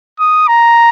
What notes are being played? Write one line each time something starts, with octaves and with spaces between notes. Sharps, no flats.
D#6
A#5